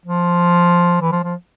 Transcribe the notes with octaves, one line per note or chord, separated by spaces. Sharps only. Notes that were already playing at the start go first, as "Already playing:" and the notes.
F3
E3
F3
F3